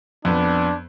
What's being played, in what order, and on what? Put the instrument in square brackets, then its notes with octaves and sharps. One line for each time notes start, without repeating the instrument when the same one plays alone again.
[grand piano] F2 B3 [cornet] D4